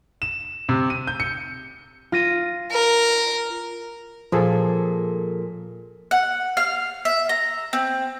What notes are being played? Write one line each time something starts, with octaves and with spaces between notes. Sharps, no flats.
E7
C3
D#7
G6
C#7
F4 A#6 D#7
A#4
A#2 F3 G#4 A4
F#5
F5
E5
A#5
C4